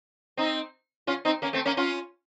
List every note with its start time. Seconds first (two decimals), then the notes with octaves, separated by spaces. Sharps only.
0.37 C4 D#4
1.07 C#4 F4
1.25 C4 D#4
1.42 A#3 C#4
1.53 A3 C4
1.65 A#3 C#4
1.77 C#4 F4